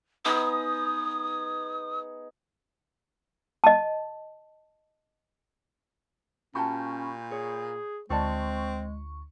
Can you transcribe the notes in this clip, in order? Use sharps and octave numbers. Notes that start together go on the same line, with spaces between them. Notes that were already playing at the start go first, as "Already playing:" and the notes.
B3 D#4 G#4 D#6
D#5 A5
A#2 C#4 F#4 G4 A5 B5 C#6 G6
G#4 C#5
D2 G#3 C4 F4 D5 A5 C#6